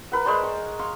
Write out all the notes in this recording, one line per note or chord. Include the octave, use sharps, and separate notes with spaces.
A#4 B4 F#5
G#3 C5 D5 C6
C#6
F5 C6 C#6